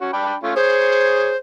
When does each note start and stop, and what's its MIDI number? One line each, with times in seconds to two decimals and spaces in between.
0.01 0.13 61
0.01 0.13 66
0.13 0.34 62
0.13 0.34 79
0.13 0.34 83
0.43 0.53 57
0.43 0.53 61
0.43 0.53 65
0.56 1.33 68
0.56 1.37 72
0.56 1.33 73